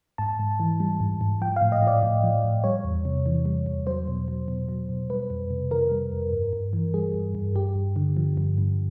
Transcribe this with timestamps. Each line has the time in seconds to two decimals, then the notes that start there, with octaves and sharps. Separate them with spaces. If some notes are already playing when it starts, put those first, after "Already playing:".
0.18 G#2 A5
0.40 G#2
0.60 E3
0.80 G3
1.00 G#2
1.21 G#2
1.41 F3 G5
1.56 F5
1.62 A2
1.72 D#5
1.82 F3 D5
2.03 A2
2.23 F3
2.44 A2
2.64 G3 C#5
2.85 E2
3.05 C3
3.26 E3
3.46 G3
3.66 E2
3.87 F#3 C5
4.08 B2
4.28 F#3
4.48 B2
4.69 F#3
4.89 B2
5.10 G3 B4
5.30 F2
5.50 C3
5.71 D#3 A#4
5.91 G3
6.12 F2
6.33 G2
6.53 G2
6.73 E3
6.94 G3 G#4
7.14 G2
7.35 G2
7.56 G2 G4
7.75 G2
7.96 D3
8.17 F3
8.37 G2
8.58 G2